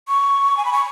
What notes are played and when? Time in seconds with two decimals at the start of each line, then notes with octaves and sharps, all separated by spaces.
0.08 C#6
0.57 G#5
0.65 B5
0.73 C#6